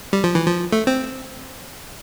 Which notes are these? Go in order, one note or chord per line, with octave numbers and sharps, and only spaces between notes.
G3
F3
E3
F3
A3
C4